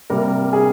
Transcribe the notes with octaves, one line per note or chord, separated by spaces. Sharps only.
C3 G3 A#3 A#4
G#4